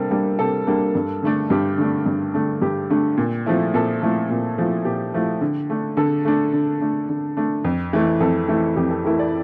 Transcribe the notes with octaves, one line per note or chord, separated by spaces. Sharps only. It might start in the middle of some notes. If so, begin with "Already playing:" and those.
Already playing: C3 G3 A#3 D4 A4
G3 A#3 D4
C3 A4
G3 A#3 D4
G2
D3 A3 D4
G2 G4
D3 A3 D4
G2
D3 A3 D4
G2 G4
D3 A3 D4
A#2
F3 A3 E4
A#2 A4
F3 A3 E4
A#2
F3 A3 E4
A#2 G4
F3 A3 E4
D3
A3 D4
D3 A4
A3 D4
D3
A3 D4
D3
A3 D4
F2
E3 A3 E4
F2 A4
E3 A3 E4
F2 G4
A4
E3 A3 E4 A#4
D5